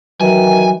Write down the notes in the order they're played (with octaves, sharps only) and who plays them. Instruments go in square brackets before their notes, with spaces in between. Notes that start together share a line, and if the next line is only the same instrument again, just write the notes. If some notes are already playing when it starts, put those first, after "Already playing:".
[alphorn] D#3 [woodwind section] E3 [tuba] F#3 [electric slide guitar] G#5